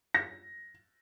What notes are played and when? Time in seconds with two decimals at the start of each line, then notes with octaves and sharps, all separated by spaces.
0.14 A#6